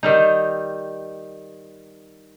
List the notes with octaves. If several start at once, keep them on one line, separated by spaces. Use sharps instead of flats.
D#3 G3 D#4